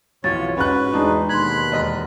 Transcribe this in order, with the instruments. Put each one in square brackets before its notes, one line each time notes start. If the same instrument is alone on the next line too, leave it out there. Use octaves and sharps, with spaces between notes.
[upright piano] B1 [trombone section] F2 E3 F4 [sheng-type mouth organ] C#5 [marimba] A6
[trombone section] G#2 [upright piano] C#4 F#6 [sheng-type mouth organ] F#4 B4
[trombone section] E2 D#4 [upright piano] G#3 D4
[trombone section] D#2 B2 [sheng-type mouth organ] B5 F#6 [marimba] C6 G#6
[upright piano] E1 D#5